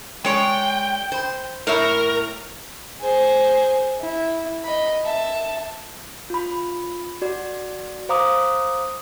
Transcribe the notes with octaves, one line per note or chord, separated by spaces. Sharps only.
G#3 C#5 D5 G5
C5
A2 A#4 C#5 E5
G#4 C5
E4
D#5 B5
E5 A5
F4 B5
F#4 D5
C5 F5 A#5 D6 D#6